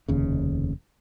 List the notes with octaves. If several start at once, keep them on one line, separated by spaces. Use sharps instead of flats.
F1 D#2 C#3